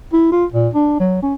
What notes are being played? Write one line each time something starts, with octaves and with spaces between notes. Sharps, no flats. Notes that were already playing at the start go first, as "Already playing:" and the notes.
E4
F4
A#2
D4
F#3
C#4